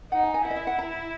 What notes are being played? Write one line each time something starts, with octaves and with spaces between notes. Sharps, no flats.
D#4 F#5
G#5
G#5
E4 F#5
D#5
E5
F#5
A#5